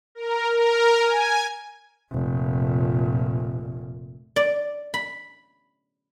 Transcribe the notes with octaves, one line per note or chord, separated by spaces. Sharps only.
A#4
A#4
G#5
F1 A#2
D5
B5